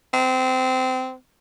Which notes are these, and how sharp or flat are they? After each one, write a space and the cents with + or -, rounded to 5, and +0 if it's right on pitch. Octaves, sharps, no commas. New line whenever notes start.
C4 -20